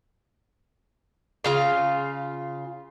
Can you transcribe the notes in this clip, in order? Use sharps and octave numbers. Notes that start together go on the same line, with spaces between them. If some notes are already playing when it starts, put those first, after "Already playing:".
C#3 F4 F5